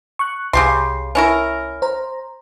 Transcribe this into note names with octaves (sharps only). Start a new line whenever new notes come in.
C#6 F#6
C2 C#3 G4 C6
C#4 E4 A#4
C5 A#5